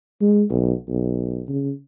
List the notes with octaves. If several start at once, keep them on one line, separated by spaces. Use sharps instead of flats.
G#3
B1
B1
C#3